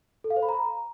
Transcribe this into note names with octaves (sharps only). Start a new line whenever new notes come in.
A4
F5
C5
B5
A#5